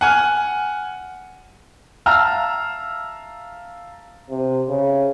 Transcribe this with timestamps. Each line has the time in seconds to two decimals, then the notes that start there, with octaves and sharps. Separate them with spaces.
0.01 F#5 G#5 F6
2.06 E5 F5 A5 A#5 E6 F6
4.30 C3
4.69 C#3